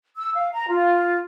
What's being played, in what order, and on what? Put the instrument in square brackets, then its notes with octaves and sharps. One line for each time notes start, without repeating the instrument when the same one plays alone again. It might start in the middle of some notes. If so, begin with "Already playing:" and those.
[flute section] E6
F5
A#5
F4